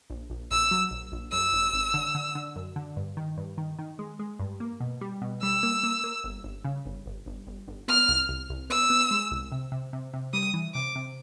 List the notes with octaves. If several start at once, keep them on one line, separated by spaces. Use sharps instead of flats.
A#1
A#1
A#1 E6
F#3
A#1
A#1
F#2 E6
G#1
G#1
D3
D3
D3
F#2
D3
G2
D#3
G2
D#3
D#3
G#3
G#3
G2
A#3
B2
G3
B2
G3 E6
A#3
A#3
A#3
G1
G1
C#3
G1
G1
G1
G1
G1
B3 F6
C2
C2
C2
B3 E6
B3
G#3
C2
C3
C3
C3
C3
G3 D#6
E3
C3 D6
C3